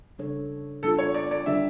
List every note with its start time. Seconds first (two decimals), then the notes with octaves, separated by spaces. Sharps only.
0.18 C#3 G3 D4 A4 C#5
0.83 A#2 G3 D4 F4 A4
0.99 C#5
1.14 D5
1.31 D5
1.46 D3 G3 D4 G4 E5